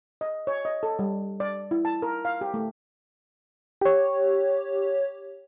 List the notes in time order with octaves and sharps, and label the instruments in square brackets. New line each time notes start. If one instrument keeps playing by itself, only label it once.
[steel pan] D#5
C#5
D#5
A4
G3
D5
E4
A5
A#4
F5
G4
A3
[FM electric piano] G4 C#5